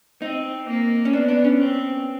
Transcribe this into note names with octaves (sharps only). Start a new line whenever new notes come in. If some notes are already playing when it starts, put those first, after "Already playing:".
C4 D#4
A#3
C#4
B3 D4
D4
C#4
C4